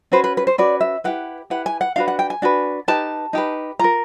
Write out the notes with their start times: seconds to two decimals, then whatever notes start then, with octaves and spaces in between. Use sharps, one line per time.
0.12 C#4 F#4 B4 C5
0.24 B4
0.37 B4
0.47 C5
0.58 C#4 F#4 B4 D5
0.81 E5
1.04 E4 G4 B4 F#5
1.50 E4 G4 B4 F#5
1.66 G#5
1.81 F#5
1.96 D4 F#4 B4 F5
2.08 F#5
2.19 G5
2.30 G#5
2.42 D4 F#4 B4
2.88 D#4 G4 B4 A5
3.33 D#4 G4 B4
3.79 F4 A#4 A#5